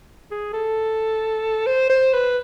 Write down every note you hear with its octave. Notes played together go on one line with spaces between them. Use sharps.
G#4
A4
C5
C5
B4